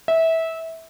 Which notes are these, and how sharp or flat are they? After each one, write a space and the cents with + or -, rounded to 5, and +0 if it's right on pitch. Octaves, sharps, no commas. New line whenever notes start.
E5 -20